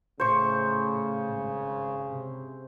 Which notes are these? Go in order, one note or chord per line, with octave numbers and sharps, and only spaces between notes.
A2 C#3 C5 C#6
G#1
C3